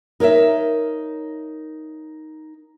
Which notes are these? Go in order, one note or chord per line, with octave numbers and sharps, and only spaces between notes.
D#4 A#4 C#5 D5 E5